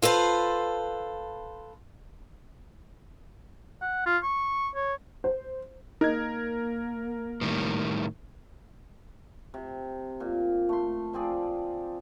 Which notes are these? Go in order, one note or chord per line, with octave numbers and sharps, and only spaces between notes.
F4 A4 B4 C5
F#5
F4
C#6
C#5
C5
A#3 D#4 A#4 G#6
A2 D#3 G3
C3
A#2
A3 C6
F3 C4 G#4 D5